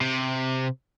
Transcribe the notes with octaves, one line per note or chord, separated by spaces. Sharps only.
C3